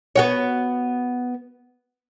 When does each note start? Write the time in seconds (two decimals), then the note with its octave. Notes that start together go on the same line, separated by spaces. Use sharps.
0.16 B3 F#4 C#5